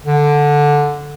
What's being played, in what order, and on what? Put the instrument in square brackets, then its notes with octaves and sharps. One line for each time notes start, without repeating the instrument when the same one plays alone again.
[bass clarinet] D3